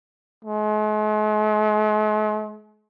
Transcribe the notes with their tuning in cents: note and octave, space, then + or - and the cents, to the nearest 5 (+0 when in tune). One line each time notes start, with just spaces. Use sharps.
G#3 +45